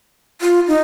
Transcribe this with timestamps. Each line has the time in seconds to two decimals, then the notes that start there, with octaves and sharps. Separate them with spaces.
0.41 F4
0.68 D#4